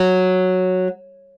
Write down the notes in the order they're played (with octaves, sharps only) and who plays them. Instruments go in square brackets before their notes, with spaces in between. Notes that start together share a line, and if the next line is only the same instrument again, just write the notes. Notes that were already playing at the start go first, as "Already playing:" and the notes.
Already playing: [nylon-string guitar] F#3